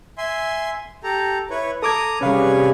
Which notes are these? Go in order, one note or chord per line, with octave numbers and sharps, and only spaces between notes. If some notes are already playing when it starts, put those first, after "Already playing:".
E5 G#5 C6
G4 A4 A#5
E4 B4 C#5
A4 A#5 D6 D#6 G#6
C3 G3 C#4 G#4 B4 C#5 F5